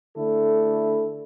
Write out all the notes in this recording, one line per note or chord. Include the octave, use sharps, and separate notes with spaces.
D3 A3 E4 A4